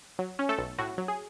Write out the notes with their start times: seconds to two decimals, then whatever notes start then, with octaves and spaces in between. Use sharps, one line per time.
0.19 F#3
0.39 C#4
0.49 A3 A4
0.58 B1
0.78 A2 F#4
0.98 F#3
1.08 G#4